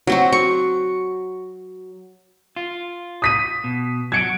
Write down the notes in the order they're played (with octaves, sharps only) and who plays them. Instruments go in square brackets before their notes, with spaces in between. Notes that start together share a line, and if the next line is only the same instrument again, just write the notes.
[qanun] F#3 C4 F#4
C#6
[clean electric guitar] F4
[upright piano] D#6 B6 D#7
[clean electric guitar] B2
[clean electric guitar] F#3 F#4 [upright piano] G#6 C#7 D7